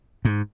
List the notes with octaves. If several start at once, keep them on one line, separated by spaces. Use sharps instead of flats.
G#2